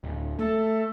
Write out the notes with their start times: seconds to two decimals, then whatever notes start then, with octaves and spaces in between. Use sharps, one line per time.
0.04 D1
0.39 A3 A4